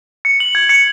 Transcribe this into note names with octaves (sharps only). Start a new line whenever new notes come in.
C#7
F#7
G#6
C#7